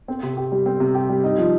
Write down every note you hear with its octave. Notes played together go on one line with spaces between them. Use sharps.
C4
C3
G4
G3
C4
C3
G4
G3
D#4
F3